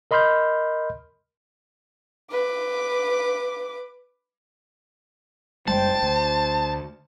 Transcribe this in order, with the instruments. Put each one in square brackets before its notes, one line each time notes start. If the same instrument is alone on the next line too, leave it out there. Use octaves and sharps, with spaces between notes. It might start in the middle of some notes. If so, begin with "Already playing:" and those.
[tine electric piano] A#4 D#5 B5 C6 F6 G6
[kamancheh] B4 D6
[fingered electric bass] F#1 G3 G#3 [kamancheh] C5 G5 [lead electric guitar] A5
[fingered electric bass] D2 [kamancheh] C5